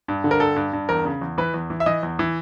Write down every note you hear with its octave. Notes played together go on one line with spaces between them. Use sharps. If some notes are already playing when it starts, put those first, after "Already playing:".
G2
D3
A#4
G2 A4
G2
G2
E2 A#4
C#3
E2
E3 B4
E2
E3
E5
E3 D#5
E2
E3